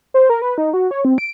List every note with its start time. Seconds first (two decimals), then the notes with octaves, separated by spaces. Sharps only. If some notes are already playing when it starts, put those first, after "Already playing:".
0.14 C5
0.30 A#4
0.42 B4
0.58 D#4
0.73 F#4
0.91 C#5
1.05 C4
1.18 D7